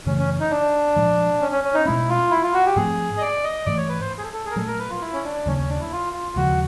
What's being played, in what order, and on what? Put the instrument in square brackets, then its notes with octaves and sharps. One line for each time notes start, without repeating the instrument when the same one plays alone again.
[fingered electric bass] F#2 C#3 E3 A3 [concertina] C#4
[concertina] C#4
D#4
D4
[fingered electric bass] A#2 F3 G#3
[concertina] C#4
C#4
C#4
D#4
[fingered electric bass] B2 G#3 C#4 [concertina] E4
[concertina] F4
E4
F4
F#4
G4
[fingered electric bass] G#2 F3 A3 C4 [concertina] G#4
[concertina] D#5
D5
D#5
[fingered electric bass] G#2 E3 A3 [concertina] D5
[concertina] C#5
B4
C5
G#4
A4
A4
G#4
A#4
[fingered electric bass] A#2 F#3 A3 [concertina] A4
[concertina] A#4
B4
F4
E4
C#4
D4
[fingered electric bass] D#2 C#3 F#3 A#3 [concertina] C#4
[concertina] C#4
D4
E4
F4
F4
[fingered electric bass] D#2 C#3 F3 G#3 [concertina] F#4